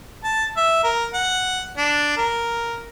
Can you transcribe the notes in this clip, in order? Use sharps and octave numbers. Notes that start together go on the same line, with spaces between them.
A5
E5
A#4
F#5
D4
A#4